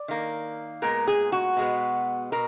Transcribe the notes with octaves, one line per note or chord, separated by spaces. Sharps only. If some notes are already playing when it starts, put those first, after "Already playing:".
Already playing: D5
D#3 A#3
A#2 G#3 B3 A#4
G#4
F#4
B2 G#3 B3
B2 A#4